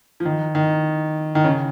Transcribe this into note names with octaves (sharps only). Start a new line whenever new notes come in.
F3
D#3
D#3
D#3
C#3